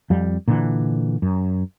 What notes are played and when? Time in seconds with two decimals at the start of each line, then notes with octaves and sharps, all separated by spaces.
0.10 F2 G3
0.48 A#2 D3 E3
1.22 F#2